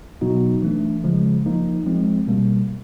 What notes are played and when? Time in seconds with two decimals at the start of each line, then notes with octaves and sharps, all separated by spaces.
0.21 B2 F#3 B3 D#4 F#4
0.62 E3 A3 D4
1.04 C#3 F3 G#3
1.46 F3 A#3 D#4
1.86 F3 G#3 C4
2.27 B2 G3 A#3